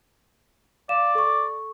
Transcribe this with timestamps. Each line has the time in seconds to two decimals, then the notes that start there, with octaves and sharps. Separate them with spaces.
0.89 D5 F5 E7
1.15 A4 C#6